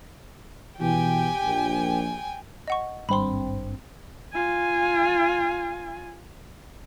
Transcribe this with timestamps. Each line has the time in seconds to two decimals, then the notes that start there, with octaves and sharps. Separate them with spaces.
0.80 B2 E3 G4 G5 G#5
1.43 A#1
2.68 D#5 F#5 C#6
3.09 G#1 G2 C4 B5 C6
4.33 F4 G#5